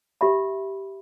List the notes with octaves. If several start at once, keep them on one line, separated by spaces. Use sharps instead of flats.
G4 E5 B5